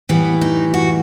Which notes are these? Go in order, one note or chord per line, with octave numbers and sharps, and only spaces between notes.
A2 E3 G3 B3
D#4
F#4